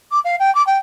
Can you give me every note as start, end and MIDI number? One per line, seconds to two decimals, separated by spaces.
0.11 0.20 86
0.25 0.36 77
0.39 0.53 79
0.55 0.65 86
0.67 0.78 79